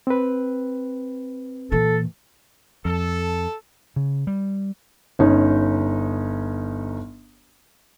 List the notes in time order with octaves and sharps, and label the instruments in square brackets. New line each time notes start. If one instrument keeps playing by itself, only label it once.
[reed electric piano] C4 B4
[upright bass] A#2 E3 [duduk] A4
[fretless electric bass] F2 [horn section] A4
[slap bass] C#3
G3
[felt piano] G1 C#4 D#4